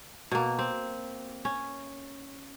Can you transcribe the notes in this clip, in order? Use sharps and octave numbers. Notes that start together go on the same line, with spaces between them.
B2 A#3
C4
C#4